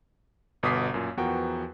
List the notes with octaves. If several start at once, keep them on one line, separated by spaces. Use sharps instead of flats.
G1 B2 D6 D#6 B6 C7
F#2 A#2
E2 F3 B3 F#4 A#4 G5